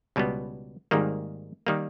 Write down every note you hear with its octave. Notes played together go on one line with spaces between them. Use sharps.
C#2 B2 G3 B3
G#1 G#2 D#3 G3 A#3
D#3 G3 A#3